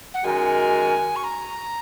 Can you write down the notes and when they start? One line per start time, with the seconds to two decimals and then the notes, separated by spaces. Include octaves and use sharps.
0.14 F#5
0.23 F#2 D#3 G#3 F#4 A#4 G#5
1.16 C#6
1.24 A#5